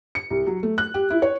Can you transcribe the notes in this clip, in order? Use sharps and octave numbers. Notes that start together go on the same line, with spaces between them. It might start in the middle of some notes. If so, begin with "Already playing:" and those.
C#7
C2
F#3
A3
F#6
G4
E4
C#5